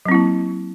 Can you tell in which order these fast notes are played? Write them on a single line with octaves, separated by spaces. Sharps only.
F#3 C4 E4 A#3